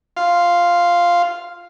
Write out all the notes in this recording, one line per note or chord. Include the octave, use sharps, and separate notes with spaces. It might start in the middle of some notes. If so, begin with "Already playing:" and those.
F4 F5